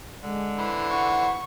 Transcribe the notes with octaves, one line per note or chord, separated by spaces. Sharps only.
D3 G#3
E3 B4 C5
F#5 C#6